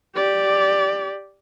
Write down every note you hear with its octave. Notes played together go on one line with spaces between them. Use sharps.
G4 D5